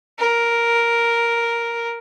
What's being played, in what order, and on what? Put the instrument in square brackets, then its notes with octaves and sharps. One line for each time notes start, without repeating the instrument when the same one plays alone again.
[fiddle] A#4